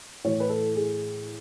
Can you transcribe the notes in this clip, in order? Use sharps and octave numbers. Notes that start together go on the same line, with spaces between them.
A2 E3 C#5
B4
A4
G#4